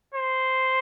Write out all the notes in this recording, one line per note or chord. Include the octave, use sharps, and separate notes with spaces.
C5